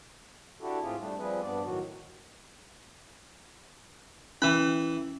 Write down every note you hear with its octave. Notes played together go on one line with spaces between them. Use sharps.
D4 E4 F#4 G4 A4
A2 C4 F4 G4 G#4
G3 A3 D4
F3 G3 C4 G#4 B4
G2 B3 D4 D5
A2 D#3 F#3 F#4
E3 C#4 B5